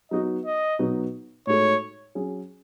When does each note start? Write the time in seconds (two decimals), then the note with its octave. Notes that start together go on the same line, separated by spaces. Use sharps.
0.11 F#3 B3 D#4 F#4 D#5
0.46 D#5
0.79 B2 F#3 B3 D#4 F#4
1.47 A2 G#3 D#4 F#4 A4 C#5
2.15 F#3 C#4 G#4